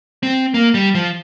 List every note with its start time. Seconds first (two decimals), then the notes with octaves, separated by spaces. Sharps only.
0.23 C4
0.54 A#3
0.74 G3
0.95 F3